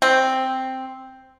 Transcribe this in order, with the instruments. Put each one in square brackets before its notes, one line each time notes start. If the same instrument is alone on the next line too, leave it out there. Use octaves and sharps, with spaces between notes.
[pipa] C4